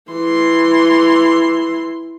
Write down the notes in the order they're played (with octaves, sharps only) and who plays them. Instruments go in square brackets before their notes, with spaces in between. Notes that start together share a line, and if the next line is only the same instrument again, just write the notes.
[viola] E3 C6